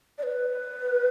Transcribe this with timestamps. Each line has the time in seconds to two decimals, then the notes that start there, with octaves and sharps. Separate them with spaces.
0.18 D5
0.23 B4